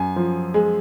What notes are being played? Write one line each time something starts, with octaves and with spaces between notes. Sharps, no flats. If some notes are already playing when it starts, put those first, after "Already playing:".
Already playing: F#2 G#5
F3
G#3